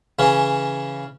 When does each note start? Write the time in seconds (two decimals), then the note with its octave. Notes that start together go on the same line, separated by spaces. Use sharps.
0.19 C#3 E3 C#4